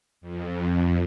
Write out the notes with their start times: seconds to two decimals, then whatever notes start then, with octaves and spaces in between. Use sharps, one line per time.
0.21 F2